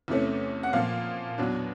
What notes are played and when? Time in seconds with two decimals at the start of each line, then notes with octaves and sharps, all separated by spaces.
0.08 E2 C3 E3 A3 C#4
0.63 F#5
0.73 A#2 F3 A#3 F5
1.38 E2 B2 F#3 B3 D4